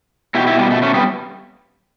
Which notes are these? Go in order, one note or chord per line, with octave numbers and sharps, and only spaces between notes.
B2 F#3 E4 G4
E4 G4
G3 B3
A3
A3 C#4
G3 B3